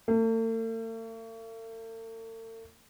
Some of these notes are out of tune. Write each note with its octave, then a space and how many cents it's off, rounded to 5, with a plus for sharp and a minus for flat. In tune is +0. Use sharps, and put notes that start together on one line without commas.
A3 +45